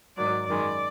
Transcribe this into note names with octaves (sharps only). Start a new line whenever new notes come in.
G#2 D#3 F#3 D5
F#2 D#3 G#3 D5